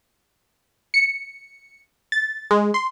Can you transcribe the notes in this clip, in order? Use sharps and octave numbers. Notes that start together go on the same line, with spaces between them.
C#7
A6
G#3
C6